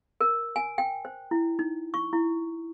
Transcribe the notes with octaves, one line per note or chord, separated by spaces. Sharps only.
A#4
G#5
G5
C5
E4
D#4
C#6
E4